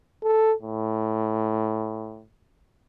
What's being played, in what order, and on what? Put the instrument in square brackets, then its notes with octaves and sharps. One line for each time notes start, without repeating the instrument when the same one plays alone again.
[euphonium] A4
A2